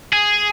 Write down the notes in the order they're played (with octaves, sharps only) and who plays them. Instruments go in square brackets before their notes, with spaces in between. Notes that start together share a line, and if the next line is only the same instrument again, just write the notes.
[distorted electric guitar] G#4